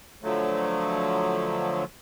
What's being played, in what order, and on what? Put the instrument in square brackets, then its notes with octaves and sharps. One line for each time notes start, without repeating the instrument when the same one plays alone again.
[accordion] D3 F3 F#3 A3